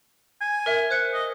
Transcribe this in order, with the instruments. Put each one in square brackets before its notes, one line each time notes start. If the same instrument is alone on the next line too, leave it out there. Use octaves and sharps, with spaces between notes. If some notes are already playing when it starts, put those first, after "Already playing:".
[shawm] G#5
[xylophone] A#4 E5
C5 F#6 C#7
[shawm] D#5